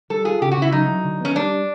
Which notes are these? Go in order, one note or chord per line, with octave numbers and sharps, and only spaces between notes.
G3 A4
F4 G#4
C#3 G4
F#4
C#3 E4
F#3 D#4
F#3
D3
B3 C#4
G3 D4